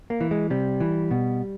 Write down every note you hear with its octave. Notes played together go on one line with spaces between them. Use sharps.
A#3
E3
G#3
C3 G3
E3
B2